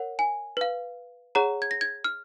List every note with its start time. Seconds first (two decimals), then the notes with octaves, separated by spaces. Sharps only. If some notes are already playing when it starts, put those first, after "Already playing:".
Already playing: A#4 C#5 F#5
0.19 G#5
0.57 B4 F5
1.35 G#4 C#5 F#5 A#5
1.62 G#6
1.71 A#6
1.81 G#6
2.04 F6